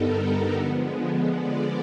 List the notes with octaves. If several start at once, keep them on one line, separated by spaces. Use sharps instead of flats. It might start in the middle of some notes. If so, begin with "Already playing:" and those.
Already playing: G2 D3 G3 B3 D#4 A4 A#4
A#4
D3 F3 G#3 B3
D5